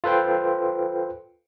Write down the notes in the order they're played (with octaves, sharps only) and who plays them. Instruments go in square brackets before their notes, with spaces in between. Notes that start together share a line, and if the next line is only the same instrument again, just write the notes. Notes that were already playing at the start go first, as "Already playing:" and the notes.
[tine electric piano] F4 A4 B4 C5 G5